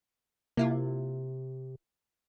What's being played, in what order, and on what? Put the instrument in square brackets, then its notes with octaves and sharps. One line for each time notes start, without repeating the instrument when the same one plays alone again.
[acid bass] C3 [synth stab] A#3 E4 F4